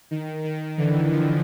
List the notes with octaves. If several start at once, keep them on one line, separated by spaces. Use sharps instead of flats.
D#3
D#3
D3 E3
D#3 F3